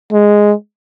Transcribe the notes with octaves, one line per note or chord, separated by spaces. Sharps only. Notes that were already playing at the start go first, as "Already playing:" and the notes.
G#3